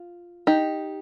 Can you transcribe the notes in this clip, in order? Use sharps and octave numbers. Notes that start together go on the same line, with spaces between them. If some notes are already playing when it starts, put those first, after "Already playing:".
Already playing: F4
D#4 G4